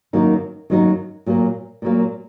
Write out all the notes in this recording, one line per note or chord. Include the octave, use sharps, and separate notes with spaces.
F#2 D#3 F#3 A#3 D#4
F#2 D#3 F#3 A#3 D#4
A#2 F#3 A#3
A#2 F#3 A#3